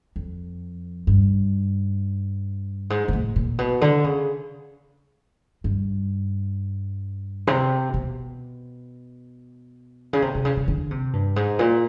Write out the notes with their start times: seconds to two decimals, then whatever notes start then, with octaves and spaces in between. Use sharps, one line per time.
0.16 F2
1.07 G2
2.90 G#2
3.08 G#2
3.13 A2
3.36 A#2
3.58 B2
3.81 D3
4.04 C#3
5.64 G2
7.47 C3
7.94 B2
10.13 C#3
10.22 C3
10.35 C3
10.45 C#3
10.57 C#3
10.68 D3
10.91 C3
11.13 G2
11.36 G#2
11.59 A#2